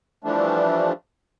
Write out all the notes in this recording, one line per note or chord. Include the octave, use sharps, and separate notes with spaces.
E3 F3 G3 A3 D4